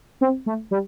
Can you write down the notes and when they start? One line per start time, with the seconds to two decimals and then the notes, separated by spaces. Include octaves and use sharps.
0.21 C4
0.46 A3
0.71 G3